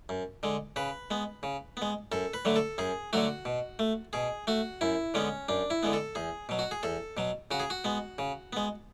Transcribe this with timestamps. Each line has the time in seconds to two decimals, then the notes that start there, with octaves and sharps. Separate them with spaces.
0.09 F#2
0.43 D3 G#3
0.76 C#3 B4
1.11 G#3 B3
1.43 C#3
1.77 G#3 B3
2.12 F#2 A4
2.34 B4
2.45 D3 F#3 A3
2.56 A4
2.78 F#2 G#4
3.13 D3 F#3 A3 F#4
3.45 B2
3.79 A3
4.13 B2 G#4
4.47 A3 F#4
4.81 F#2 E4
5.14 D3 G#3 B3 C#4
5.48 F#2 D4
5.70 E4
5.83 D3 G#3 B3
5.93 A4
6.15 E2 G#4
6.49 B2 F#3
6.59 F#4
6.71 G#4
6.83 E2 A4
7.17 B2 F#3
7.51 C#3 F#4
7.60 G#4
7.70 F#4
7.84 G#3 B3
8.18 C#3
8.53 G#3 B3